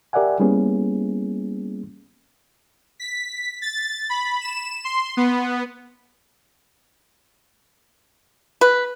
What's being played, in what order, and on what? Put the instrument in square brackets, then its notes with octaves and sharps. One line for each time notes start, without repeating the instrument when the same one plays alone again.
[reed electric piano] G4 A#4 D5 E5 F#5 G#5
G3 A#3 B3 C#4 E4 G#4
[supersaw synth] B6
A6
B5
E7
C6
B3
[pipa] B4